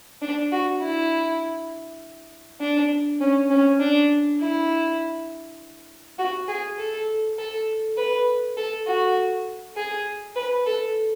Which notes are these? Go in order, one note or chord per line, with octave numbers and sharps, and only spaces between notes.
D4
F#4
E4
D4
C#4
C#4
D4
E4
F#4
G#4
A4
A4
B4
A4
F#4
G#4
B4
A4